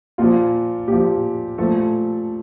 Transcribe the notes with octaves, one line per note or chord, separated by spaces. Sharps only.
A#2 F3 F4
A#2 F3 G4
A#2 F3 A3 A4